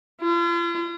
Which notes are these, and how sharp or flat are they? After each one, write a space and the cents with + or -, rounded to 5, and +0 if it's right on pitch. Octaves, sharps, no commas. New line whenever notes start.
F4 -40